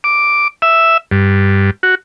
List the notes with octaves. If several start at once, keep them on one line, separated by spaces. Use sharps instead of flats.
D6
E5
G2
F#4